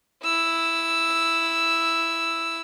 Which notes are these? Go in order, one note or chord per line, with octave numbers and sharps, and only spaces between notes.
E4 E6